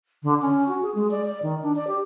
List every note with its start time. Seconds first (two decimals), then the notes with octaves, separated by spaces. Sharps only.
0.23 D3
0.42 C#4
0.68 F#4
0.82 G#4
0.95 G#3
1.11 D5
1.25 D5
1.43 D#3
1.62 D4
1.76 D5
1.87 G4